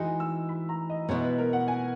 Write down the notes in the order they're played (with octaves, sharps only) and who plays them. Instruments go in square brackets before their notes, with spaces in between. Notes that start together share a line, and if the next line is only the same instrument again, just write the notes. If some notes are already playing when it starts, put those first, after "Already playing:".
Already playing: [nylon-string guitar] E3 G#3 D#4 F#4
[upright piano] E6
B5
A#5
D#5
[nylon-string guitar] B2 G#3 B3 E4 [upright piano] C#5
[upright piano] B4
A#4
F#5
G#5